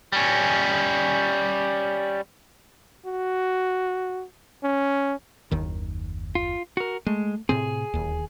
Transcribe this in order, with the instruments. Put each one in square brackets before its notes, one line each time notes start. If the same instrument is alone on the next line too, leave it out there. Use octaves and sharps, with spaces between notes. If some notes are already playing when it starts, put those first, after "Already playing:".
[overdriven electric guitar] G3 C#4
[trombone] F#4
C#4
[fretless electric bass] F#1 D#2 D#3
[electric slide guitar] F4
F#4 A#4
[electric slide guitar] G#3 [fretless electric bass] A3
[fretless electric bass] A2 C3 C4 [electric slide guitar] G#4
[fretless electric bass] D1 D#2